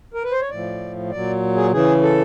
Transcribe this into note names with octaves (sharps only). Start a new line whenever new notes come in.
A#4
B4
C5
C#5
A2 F3 D5
A#2 F#3 D5
G#4
C#3 E3 G#4
A4